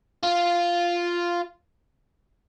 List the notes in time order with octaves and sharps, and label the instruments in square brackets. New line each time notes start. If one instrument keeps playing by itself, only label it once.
[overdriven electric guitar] F4